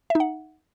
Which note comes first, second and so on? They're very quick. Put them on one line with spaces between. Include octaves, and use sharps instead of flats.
E5 D#4 F#5